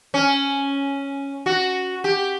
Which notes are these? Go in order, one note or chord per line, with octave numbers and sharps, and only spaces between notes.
C#4
F#4
G4